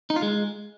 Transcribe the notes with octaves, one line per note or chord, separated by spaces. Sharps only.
D#4
F4
G#3